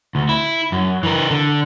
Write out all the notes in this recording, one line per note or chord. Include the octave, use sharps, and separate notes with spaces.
D2
E4
F#2
E3 A#4
D3